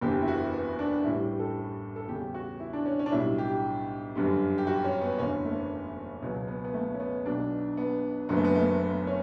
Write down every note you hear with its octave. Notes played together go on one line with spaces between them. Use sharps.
F#1 E2 D3 G4
E4
F#4
B3
D4
A1 A2 G3 E4
G4
A4
A4
E2 C#3 G3 G4
F#4
E4
D4
C#4
C#4
D4
B1 A2 G3 E4
G4
G1 F#2 D3 G3
G4
F#4
C#4
B3
F#1 E2 D3 C#4
A3
C#2 B2 F#3 B3
B3
B3
A3
C#4
B3
B1 B2 F#3 D4
B3
F#1 F#2 D3 F#3 B3
A3
B3
A3
B3
C#4